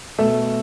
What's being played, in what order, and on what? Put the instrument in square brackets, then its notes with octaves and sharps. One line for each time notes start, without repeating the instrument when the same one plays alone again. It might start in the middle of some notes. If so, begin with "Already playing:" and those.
[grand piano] B2 A3 A4